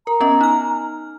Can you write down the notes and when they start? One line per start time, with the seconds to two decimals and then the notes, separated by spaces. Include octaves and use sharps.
0.07 A#4 A#5
0.20 B3 C#4 D#5
0.41 D#4 F6